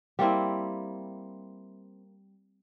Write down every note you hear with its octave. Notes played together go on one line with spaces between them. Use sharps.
G3 A#3 C4 E4